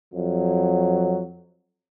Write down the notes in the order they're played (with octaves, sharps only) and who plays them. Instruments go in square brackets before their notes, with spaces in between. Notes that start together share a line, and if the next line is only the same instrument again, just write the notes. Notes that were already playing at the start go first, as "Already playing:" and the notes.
[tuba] F2 [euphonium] F#3